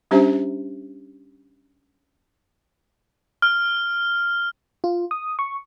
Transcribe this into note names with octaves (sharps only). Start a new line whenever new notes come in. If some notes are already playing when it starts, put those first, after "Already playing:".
G3 C#4 D4 G4 C5 E5
F6
F4
D#6
C#6